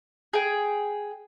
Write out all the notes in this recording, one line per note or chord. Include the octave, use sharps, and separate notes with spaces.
G#4 G5